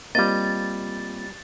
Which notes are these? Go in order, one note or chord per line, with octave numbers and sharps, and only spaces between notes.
G3 A#3 C4 F4 D#5 A6